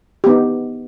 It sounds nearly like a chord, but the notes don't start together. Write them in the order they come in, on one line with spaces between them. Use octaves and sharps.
G4 B3 D#4